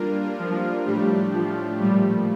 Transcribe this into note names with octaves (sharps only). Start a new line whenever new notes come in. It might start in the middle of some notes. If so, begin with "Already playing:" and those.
Already playing: G3 A#3 D4 F4 A#4
F3
A2 F3 G3 A3 D4 G4
F3
A#2 F3 G3 A3